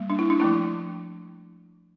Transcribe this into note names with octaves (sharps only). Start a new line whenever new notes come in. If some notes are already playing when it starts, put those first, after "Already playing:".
Already playing: G3 A#3
D4
E4
D4
F3 A3 C4 E4